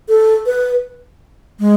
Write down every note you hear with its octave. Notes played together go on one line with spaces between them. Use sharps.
A4
B4
G#3